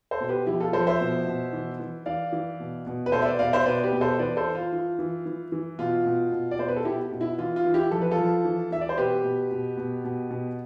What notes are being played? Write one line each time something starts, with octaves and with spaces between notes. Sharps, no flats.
A4 C5
B2
G4 B4
F3 E4 G4
F4 A4
F3 A4 C5
C5 E5
B2
B2
E3
E3
E3 D5 F5
E3
B2
B2
B4
B2 A4 C5
E5
B4 D5
B2 D5 F5
C5 E5
B2 B4 D5
G4 B4
B2
A4 C5
E3 B4 D5
A4 C5
E3
F4
E3
E3
E3
E3
B2 F4
B2
B2
D5
B2 C5
B4
A4
B2 E4 G4
B2
E4
E3 F4
F4
E3
E4 G4
F3 A4
B4
F4 A4
F3
E3
E3 E5
D5
C5
B2 G4 B4
B2
B2
B2
B2
B2